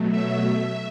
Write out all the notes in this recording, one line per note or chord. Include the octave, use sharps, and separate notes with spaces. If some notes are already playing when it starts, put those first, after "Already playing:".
Already playing: B2 F#3 A3
E5